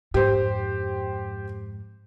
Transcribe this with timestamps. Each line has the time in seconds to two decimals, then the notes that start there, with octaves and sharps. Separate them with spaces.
0.14 F2 G#2 G4 C5